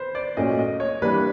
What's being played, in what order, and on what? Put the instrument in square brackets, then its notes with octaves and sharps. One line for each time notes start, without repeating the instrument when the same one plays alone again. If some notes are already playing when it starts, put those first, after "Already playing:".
Already playing: [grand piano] B4 C5
D5
[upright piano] A#2 F#3 A3 C#4 [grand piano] D#5
[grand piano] D#5
C#5
[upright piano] E3 G3 A#3 D4 [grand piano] B4